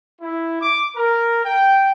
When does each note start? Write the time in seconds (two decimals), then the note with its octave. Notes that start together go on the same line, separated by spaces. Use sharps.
0.21 E4
0.62 D6
0.95 A#4
1.44 G5